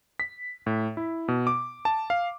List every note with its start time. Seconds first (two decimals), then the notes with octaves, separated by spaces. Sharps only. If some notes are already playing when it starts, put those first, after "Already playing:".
0.20 B6
0.66 A2
0.97 E4
1.28 B2
1.47 D6
1.85 A5
2.10 F5